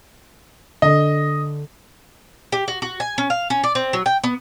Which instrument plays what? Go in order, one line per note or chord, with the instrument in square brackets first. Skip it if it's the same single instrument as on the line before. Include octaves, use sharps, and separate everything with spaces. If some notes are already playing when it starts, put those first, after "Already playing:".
[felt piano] D3 [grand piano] D#5
[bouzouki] G4
F#4
F#4
G#5
C#4
F5
C#4
D5
C4
F#3
G5
B3